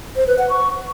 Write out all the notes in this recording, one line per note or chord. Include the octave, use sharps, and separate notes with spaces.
C5
B4
F#5
C#6